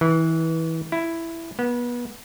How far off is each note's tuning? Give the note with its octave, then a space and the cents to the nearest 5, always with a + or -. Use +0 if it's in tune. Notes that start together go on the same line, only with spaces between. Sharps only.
E3 -25
E4 +5
B3 -30